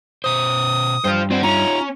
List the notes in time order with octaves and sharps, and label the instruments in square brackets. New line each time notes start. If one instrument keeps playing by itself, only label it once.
[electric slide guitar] B2 C5 [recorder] D#6
[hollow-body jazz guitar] G2 [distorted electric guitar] C5 F5
[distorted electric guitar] C4 [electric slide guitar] F4 D5 F#5
[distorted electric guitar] C#4 [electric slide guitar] D#4 F4 [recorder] A#5